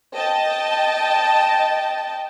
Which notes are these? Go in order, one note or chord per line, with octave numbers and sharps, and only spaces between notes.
D#5 G5 A5